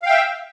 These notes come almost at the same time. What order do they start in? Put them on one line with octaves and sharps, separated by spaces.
F5 G5 E5